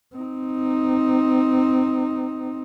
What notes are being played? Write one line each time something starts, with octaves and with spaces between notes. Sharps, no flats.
C4 D#4